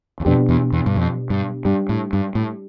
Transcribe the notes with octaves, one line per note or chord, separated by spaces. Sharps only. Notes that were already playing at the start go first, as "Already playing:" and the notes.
E2
F2 B2 B3 D4 G4
E2
E2
G2
F2
G2
G2 G3 D4 G4
A2
G2
A2